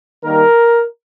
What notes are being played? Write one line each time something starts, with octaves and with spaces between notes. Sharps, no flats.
D#3 G3 A#3 A#4